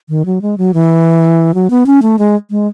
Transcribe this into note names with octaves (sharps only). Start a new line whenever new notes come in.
D#3
F#3
G#3
F#3
E3
F#3
B3
C#4
A3
G#3
G#3